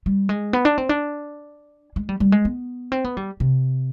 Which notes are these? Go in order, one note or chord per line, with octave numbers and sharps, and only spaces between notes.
G3
G#3
B3
D4
C4
D4
G#3
G3
G3
G#3
B3
C4
B3
G3
C3